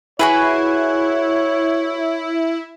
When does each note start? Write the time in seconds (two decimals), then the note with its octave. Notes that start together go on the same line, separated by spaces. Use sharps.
0.19 E4 F#4 G#4 B4 C#5